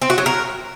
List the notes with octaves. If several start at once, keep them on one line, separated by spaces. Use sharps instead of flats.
C4
F#4
F#3
A#4